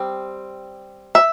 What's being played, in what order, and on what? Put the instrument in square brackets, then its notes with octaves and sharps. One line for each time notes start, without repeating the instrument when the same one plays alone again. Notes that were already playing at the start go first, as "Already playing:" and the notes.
Already playing: [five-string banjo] G3 C4
E5